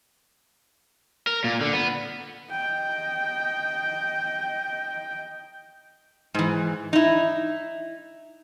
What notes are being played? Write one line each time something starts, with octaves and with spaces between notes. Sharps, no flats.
A#4
A#2
D3
B3
D#5 G5
G#2 E3
D#4 E4